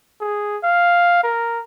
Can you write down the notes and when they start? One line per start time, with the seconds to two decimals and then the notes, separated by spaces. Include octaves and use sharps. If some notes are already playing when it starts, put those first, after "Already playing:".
0.21 G#4
0.64 F5
1.24 A#4